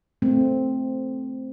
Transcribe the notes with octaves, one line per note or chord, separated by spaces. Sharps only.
A3 C4